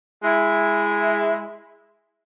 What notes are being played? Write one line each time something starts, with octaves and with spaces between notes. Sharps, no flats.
G#3 E4